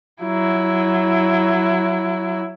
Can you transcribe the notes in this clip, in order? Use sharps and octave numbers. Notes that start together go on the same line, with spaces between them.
F#3 E4